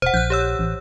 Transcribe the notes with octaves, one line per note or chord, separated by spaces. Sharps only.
E1 C5 F#5
A#1 F#6 G6
G4 C#5 E6
A1